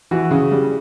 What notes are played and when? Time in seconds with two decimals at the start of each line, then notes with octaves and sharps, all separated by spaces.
0.11 E3 F#4
0.31 C#3
0.52 G3